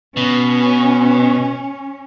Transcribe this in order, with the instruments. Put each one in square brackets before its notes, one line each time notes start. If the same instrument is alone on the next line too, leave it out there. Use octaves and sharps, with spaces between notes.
[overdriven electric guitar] B2 [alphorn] B3 [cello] C#4